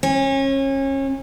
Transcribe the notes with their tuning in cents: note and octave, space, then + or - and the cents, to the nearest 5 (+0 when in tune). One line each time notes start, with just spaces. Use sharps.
C#4 -30